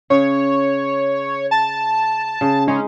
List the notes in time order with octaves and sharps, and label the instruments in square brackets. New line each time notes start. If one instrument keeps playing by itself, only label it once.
[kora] C#3 [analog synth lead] C#5
[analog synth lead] A5
[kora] C#3
[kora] G#3 D#4 [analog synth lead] C#4